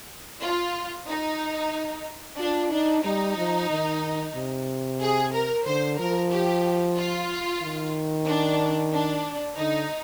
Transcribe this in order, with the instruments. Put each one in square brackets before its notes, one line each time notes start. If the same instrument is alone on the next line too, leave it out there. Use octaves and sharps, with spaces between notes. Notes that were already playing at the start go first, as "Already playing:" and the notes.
[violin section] F4
D#4
[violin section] D4 [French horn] F4
[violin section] D4 [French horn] D#4
[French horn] G3 [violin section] D#4
[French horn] F3
D#3
C3
[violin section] G#4
A#4
[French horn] D3 [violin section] C5
[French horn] F3 [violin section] A#4
[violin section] G4
F4
[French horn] D#3
[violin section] D4
D4
[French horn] D3 [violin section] D#4